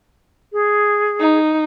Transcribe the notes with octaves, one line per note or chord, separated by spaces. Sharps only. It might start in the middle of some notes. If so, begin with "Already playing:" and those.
G#4
D#4